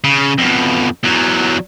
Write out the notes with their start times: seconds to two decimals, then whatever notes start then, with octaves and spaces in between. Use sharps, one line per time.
0.04 C#3
0.38 F2 B2
1.04 E2 F#3